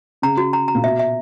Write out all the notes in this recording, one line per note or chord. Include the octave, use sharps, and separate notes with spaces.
C#3 A#5
F#4
A#5
A#5
A#2
B2 E5
E5